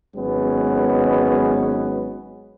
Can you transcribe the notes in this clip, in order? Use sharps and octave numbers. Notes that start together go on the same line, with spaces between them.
G#1 F#3 G#3 B3 C#4 B4